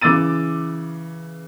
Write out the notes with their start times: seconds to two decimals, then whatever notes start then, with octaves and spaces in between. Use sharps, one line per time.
0.01 C#3 E3 D6 E6 A6 D#7